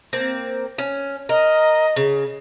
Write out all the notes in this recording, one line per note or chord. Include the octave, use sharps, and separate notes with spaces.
A#3 C4
C#4
A#4 D#5
C#3